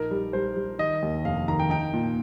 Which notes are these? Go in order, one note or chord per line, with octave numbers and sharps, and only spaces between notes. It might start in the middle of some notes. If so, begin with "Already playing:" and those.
Already playing: A#1 D#4 A#4
G3
G3 C5
G3
D#3 D#5
D#2
F1 F5
D#3 A#5
G5
D#4 G5
A#2